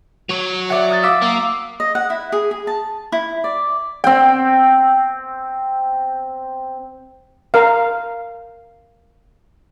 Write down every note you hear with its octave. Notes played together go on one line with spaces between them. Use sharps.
F#3 C#5
D5 E5 F#5
D#6 F#6 A6
F5 D6 E6 B6
A#3
D#5
F#5
E4
G#4
G#4
A5
E4
D5
C4 G5
A#4 F5